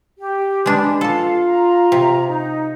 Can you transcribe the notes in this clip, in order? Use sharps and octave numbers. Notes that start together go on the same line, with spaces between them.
G4
G#3 D4 B4
F4 A4 F5 A5
A#5
C3
D#4